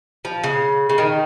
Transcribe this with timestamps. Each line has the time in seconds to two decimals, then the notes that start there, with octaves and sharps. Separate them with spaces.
0.25 F3
0.44 C#3
0.89 C#3
0.98 D#3